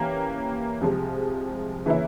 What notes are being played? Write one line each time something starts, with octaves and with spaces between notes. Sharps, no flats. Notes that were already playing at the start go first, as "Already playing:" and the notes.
Already playing: E3 A#3 C#4 G4
C2 C3 F3 G#3
C#3 E3 A#3 C#4 E4